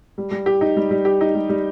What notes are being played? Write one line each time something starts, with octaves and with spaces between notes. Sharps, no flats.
G3
G3
G4
D#4
G3
G3
G4
D#4
G3
G3